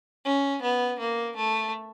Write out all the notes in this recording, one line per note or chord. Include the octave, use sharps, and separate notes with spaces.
C#4
B3
A#3
A3